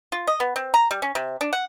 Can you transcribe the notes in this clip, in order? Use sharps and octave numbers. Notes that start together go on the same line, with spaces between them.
F4
D#5
B3
C4
A#5
G3
C#4
C3
D4
F#5